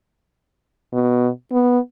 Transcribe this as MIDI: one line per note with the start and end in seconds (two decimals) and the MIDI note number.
0.93 1.29 47
1.52 1.78 59